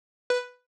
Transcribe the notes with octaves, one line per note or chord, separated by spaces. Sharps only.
B4